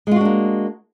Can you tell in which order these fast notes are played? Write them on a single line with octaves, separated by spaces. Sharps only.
G#3 F4 F#4 D4 A#3